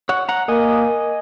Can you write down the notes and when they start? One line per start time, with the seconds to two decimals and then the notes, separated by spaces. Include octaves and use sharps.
0.09 C#5 F#5
0.29 F#5 A#5
0.48 A#3 D#5 G#5